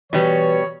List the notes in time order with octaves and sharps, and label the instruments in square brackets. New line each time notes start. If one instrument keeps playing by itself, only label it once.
[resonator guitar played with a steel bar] B2 G3 [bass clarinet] E3 [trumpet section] C#5